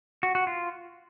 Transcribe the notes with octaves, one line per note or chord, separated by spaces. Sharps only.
F#4
F#4
F4